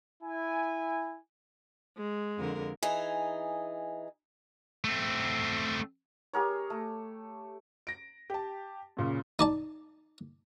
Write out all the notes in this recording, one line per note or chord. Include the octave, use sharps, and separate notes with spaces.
E4 G#5
G#3
F2 D3 A#4
E3 D#4 G#4
A3 C4
G4 G#4 A#4 C#5
A3
A#6 D7
G4 A5
F#2 A#2 C#3
D#4 D5 A5